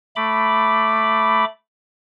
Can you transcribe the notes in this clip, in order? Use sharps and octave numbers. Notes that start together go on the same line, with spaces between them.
A3 B5 D6